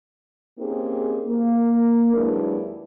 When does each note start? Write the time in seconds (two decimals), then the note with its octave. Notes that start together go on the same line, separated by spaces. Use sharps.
0.59 A#3 C4 C#4 D#4 G4 G#4
1.27 A#3
2.14 D#2 F#3 G#3 D4 E4 B4